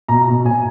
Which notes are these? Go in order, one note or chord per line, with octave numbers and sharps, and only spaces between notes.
B2 A#5
B2
B2 G#5